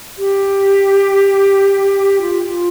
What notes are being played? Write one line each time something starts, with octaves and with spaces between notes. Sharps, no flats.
G4
F4
F4